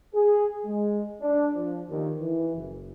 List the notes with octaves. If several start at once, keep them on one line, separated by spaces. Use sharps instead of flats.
G#4
G#3
D4
F3
D#2
E3
F#1